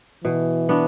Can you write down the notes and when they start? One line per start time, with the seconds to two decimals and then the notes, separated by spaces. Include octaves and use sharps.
0.24 B2 E3
0.69 B3 D4 F#4